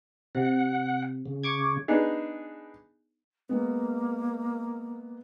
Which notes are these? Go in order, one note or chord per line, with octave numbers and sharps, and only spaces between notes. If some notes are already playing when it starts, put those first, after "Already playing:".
C3 F#5
C#3
C#6 D6 G#6
B3 D4 D#4 G#4
G#3 A#3 B3